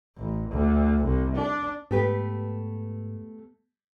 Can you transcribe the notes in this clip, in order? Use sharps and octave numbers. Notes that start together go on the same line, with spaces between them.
A1
D2
C2
D4
G#2 A3 B3 G4 B4